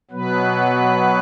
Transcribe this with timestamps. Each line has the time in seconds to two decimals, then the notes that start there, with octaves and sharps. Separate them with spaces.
0.11 B2 F#3 B3 B4